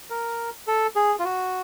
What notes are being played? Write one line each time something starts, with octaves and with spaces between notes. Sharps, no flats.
A#4
A4
G#4
F4
F#4